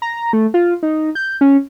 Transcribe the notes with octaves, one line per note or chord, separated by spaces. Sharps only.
A#5
A3
F4
D#4
G6
C#4